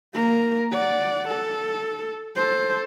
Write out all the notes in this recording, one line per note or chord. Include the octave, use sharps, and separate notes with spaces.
A#3 A#4
D5 F#5
A4
A4 C5